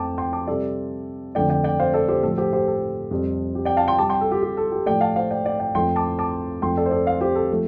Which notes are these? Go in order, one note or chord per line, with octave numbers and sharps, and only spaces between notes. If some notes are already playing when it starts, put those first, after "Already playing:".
Already playing: F2 F3 A3 G5 A5 D6
G5 C6
A5 D6
C3 G3 A4 D5
F2 D3 F3 A3 D5 G5
D5 G5
D5 G5
C5 F5
A4 D5
G4 C5
A2 F3 A3 A4
G4 C5
G4 C5
A4
F2 C3 G3
G4
D5 G5
F5 A5
G5 C6
C3 G3 A5 D6
G5 C6
A4
G4
G4
A4
G4
A2 F3 A3 D5 G5
F5 A5
C5 F5
D5 G5
D5 G5
D5 G5
F2 F3 A3 G5 C6
A5 D6
A5 D6
F2 F3 A3 G5 C6
A4 D5
C5
A4 D5
C5 F5
G4 C5
A4
F3 A3